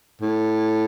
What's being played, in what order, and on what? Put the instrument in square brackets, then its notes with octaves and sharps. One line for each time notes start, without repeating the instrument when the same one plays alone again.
[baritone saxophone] A2